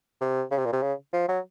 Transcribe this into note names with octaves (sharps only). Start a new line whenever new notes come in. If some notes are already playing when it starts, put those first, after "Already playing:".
C3
C#3
C3
A#2
C3
C#3
F3
F#3